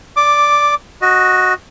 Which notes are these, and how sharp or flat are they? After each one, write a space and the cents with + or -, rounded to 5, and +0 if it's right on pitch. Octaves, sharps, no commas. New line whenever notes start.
D5 -10 D6 +5
F#4 -5 D#5 +0